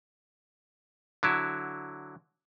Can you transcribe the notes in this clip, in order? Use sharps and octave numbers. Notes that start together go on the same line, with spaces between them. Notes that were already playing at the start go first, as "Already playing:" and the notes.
D3 F#3 E4